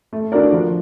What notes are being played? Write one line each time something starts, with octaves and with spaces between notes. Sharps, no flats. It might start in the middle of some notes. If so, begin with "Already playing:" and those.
A3
D4 F#4 A#4 D5
F3